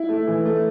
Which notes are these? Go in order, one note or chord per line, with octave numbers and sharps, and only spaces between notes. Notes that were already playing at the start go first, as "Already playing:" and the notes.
Already playing: E4
A3
E3
A3